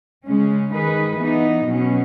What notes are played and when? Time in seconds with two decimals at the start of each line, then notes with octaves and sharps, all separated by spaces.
0.25 C#3 G#3 C#4
0.72 D#3 G#3 D#4 G#4 B4
1.20 E3 B3 D#4
1.67 B2 F#3 C#4